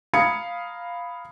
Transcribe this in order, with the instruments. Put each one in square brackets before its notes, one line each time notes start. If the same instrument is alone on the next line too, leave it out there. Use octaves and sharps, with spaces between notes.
[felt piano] F5 A#5 B5 D#6 G#6 C#7